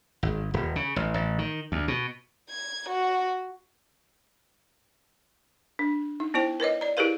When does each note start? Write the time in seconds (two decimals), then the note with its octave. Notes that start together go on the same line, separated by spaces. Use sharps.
0.23 G#1
0.54 D#1
0.76 C#3
0.96 A1
1.14 A1
1.39 D#3
1.72 D2
1.88 B2
2.49 G#6
2.88 F#4
5.79 D4
6.20 D#4
6.34 B3 E4 C5 G5
6.60 A#4 B4 C#5 D#5
6.81 D5 A#5
6.97 E4 G4 G#4 A#4 B4 F5